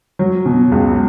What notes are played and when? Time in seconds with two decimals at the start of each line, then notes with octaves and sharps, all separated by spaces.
0.19 F#3
0.46 B2
0.72 C#2